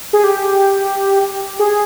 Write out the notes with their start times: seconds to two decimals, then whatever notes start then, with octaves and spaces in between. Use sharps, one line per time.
0.13 G#4
0.24 G4
1.59 G#4